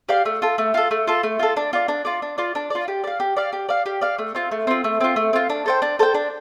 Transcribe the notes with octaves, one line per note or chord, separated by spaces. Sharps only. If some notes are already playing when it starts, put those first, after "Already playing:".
G4 D5 F5
A3
F4 A4
A3
F4 A4
A3
F4 A4
A3
F4 A4
D4
F4 D5
D4
F4 D5
D4
F4 D5
D4
F4 D5
G4
D5 F5
G4
D5 F5
G4
D5 F5
G4
D5 F5
A3
C4 F4
A3
C4 F4
A3
C4 F4
A3
C4 F4
D4
A4 C5 G5
D4
A4 C5 G5
D4